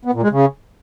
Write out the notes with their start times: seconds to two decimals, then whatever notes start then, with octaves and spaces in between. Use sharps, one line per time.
0.05 B3
0.14 A#2
0.22 G#3
0.31 C#3